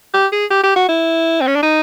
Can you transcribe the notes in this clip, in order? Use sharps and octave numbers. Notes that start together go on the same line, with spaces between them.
G4
G#4
G4
G4
F#4
E4
C4
C#4
D4
D#4